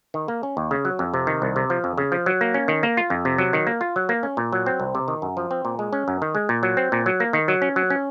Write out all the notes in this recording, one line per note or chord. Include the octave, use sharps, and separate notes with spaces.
D#3
A#3
C#4
D#2
C#3
F#3
F2
C3
D#3
C2
C3
F3
F2
C#3
F3
F#3
A#3
C#4
D#3
A#3
F4
F2
C3
F#3
D#3
A#3
F4
F#3
A#3
C#4
A#2
F#3
C4
C2
C3
D#3
F#2
F3
C4
A#2
G#3
C#4
F#2
D#3
G#3
A#2
F#3
C4
A#2
F#3
A#3
D#3
F#3
C#4
F#3
C#4